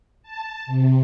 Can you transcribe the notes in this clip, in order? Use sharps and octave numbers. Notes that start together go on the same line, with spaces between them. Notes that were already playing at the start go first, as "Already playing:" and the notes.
A5
C3